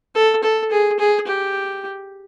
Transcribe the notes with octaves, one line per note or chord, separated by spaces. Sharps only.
A4
A4
G#4
G#4
G4